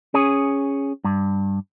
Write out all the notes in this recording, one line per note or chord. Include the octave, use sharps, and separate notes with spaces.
C#4 G#4
G2